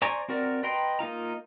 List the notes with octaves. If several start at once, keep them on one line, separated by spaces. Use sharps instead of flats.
C5 D5 G#5 A#5 C#6
C4 F#4 A#4 D5
B4 D#5 G5 A#5 C6
A#3 D#4 F4 A#5